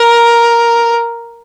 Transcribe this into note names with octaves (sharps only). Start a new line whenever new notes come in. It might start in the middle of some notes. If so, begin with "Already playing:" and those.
Already playing: A#4